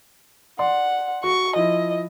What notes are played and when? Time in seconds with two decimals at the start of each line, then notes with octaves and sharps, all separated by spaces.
0.59 D5 F#5 C6
1.24 F#4 C#6
1.56 F3 E4 D#5